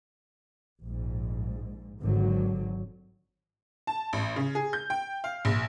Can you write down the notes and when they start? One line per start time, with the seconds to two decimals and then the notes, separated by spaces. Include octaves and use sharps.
0.82 A#1 G#2
2.00 G#1 D3 F#3
3.87 A5
4.13 A1
4.36 C#3
4.55 G#4
4.73 G6
4.90 G5
5.24 F5
5.45 A#1